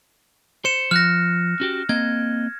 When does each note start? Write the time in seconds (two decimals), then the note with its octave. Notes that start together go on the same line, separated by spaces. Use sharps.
0.65 C5 C#7 E7
0.91 F3 F6 F#6 A#6
1.60 C#4 F#4 G4
1.89 A#3 C4 D#5 G#6